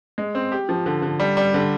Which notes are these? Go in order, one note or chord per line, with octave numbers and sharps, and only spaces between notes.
G#3
C4
G4
F3
D3
D3
G3
G3
D3